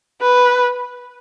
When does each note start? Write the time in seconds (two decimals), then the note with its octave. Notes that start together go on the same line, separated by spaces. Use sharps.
0.21 B4